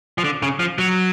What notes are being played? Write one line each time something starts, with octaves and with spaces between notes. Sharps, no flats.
F3
D3
C#3
F3
F#3